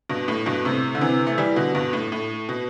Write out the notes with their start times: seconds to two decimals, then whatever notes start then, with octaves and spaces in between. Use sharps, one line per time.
0.09 G2 B2
0.28 A2
0.46 G2 B2
0.65 A2 C3
0.95 D3
1.01 C3 E3
1.27 A3
1.38 E3 G3
1.56 B2 D3
1.75 G2 B2
1.93 A2
2.12 A2
2.49 B2